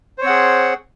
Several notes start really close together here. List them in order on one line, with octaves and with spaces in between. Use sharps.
C5 C#5 C4 F#5 G#4